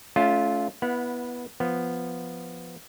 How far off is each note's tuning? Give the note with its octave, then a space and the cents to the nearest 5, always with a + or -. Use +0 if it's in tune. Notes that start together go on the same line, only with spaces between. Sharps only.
A3 -30 C#4 +25 F4 +0
B3 -10 E4 +0 F#5 -30
F3 +0 B3 +0